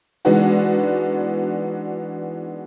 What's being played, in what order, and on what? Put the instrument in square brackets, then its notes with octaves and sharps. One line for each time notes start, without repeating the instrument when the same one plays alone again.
[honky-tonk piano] E3 G#3 B3 D4 D#4 F#4